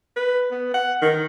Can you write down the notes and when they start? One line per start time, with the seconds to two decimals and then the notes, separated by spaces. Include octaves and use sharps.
0.16 B4
0.51 B3
0.74 F#5
1.02 D#3